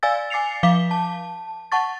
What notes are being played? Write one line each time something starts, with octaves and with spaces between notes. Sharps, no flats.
D5 F5 G#5 E6 A6
G#5 D6 A6 C7 C#7 F7
F3 F5 D6 B6 G7
A5
F#5 A5 C#6 A6